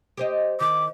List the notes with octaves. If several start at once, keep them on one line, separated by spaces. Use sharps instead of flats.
G4 C5 D#5
D#3 D6